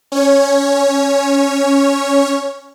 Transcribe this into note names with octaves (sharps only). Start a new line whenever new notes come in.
C#4 C#5